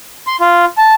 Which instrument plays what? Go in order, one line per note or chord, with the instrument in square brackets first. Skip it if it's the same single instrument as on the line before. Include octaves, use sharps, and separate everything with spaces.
[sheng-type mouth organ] C6
F4
A5